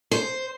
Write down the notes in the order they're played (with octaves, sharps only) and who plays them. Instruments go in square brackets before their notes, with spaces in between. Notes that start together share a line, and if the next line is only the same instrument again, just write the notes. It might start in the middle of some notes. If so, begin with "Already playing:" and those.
[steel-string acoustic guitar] C5